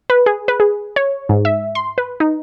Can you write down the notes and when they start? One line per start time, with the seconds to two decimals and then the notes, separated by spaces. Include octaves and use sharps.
0.10 B4
0.26 G#4
0.48 B4
0.60 G#4
0.96 C#5
1.29 G#2
1.45 E5
1.75 C6
1.98 B4
2.20 D#4